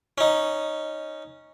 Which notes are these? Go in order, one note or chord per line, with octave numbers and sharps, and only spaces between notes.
C#4 D#4